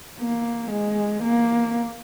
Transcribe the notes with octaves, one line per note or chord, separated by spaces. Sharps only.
A#3
G#3
A#3